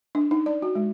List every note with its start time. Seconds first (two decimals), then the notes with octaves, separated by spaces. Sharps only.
0.15 D4
0.31 D#4
0.46 D5
0.62 F#4
0.75 G#3